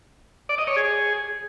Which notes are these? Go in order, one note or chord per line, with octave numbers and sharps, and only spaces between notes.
D5
D#5
C#5
G#4